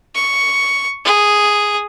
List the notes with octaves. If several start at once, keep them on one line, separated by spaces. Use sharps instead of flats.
C#6
G#4